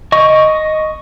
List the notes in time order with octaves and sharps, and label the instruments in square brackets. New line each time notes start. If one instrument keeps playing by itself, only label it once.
[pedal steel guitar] D#5 C#6